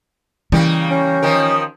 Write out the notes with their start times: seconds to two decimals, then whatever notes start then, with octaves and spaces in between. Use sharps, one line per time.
0.52 C#3 E3 G3 A#3
0.91 C#4
1.22 D#3 F3 A#4